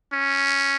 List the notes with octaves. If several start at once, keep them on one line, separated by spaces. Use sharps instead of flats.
C#4